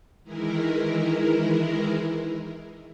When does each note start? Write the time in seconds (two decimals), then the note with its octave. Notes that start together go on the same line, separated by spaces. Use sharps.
0.24 D#3 E3 G#3 E4 A#4